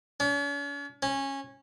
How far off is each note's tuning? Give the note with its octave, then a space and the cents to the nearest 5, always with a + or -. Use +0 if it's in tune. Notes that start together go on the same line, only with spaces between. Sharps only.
C#4 +45
C#4 -15